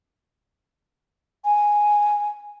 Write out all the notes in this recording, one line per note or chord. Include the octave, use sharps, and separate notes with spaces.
G#5